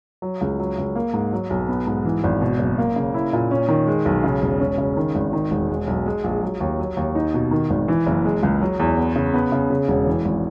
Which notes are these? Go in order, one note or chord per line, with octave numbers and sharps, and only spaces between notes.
F#3
C#2
F#3
C#2
A#3
G#2
F#3
B1
B3
G#2
E3
G#1
B2
F#1
A#3
C#3
E4
A#2
C#4
D#3
G#3
B1
C#3
E1
C#4
C#3
D#3
G#1
D#3
E1
G#3
B1
G#3
A#1
F#3
D#2
F#3
D#2
D#4
B2
D#3
G#1
E3
F#1
G#3
C#2
F#3
E2
B3
C#3
B3
C#3
C#3
E1
E3
G#1